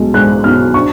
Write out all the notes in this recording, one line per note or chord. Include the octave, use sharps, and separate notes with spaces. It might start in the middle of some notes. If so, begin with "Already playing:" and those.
Already playing: B1 G#3
G#3 F#6
B1 F6
D4 C#6